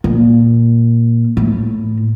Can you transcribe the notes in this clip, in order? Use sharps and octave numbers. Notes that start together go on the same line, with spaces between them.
A#2
A2